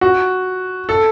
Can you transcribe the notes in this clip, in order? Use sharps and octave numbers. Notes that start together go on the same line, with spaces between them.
F#4
A4